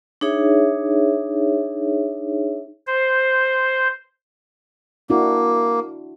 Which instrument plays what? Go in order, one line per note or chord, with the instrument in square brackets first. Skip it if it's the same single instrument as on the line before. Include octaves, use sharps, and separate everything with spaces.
[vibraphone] D4 D#4 G#4 C#5 E5
[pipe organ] C5
[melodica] A#3 [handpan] D4 E4 F#4